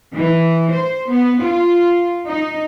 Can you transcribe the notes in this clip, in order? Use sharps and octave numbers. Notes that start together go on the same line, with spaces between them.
E3
C5
B3
F4
D#4